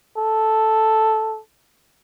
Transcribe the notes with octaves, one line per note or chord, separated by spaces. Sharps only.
A4